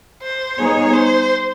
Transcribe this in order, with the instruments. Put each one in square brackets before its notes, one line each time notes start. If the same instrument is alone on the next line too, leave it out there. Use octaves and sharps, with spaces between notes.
[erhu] C5
[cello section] G3 B3 D#4 G#4 [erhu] C#5
[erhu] C5